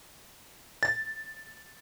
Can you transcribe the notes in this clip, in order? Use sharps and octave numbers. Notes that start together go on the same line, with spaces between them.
A6